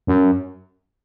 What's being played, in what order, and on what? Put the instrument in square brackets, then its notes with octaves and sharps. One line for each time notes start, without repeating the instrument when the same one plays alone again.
[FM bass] F#2